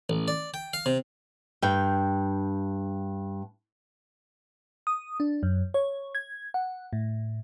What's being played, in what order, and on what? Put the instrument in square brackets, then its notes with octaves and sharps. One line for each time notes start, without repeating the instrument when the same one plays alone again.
[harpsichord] A1
D5
G5
F5
C3
[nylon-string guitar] G2 G5
[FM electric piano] D#6
D4
F#2
C#5
G#6
F#5
A2